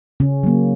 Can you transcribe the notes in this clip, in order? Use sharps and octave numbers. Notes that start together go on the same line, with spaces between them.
C#3 C#4
F#3 A#3